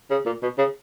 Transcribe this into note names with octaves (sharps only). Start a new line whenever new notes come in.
C#3
A#2
B2
C#3